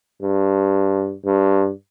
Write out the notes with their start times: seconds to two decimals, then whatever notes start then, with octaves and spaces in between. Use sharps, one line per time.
0.22 G2
1.25 G2